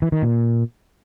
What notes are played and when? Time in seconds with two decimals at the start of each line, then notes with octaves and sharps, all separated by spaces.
0.02 E3
0.12 D#3
0.22 A#2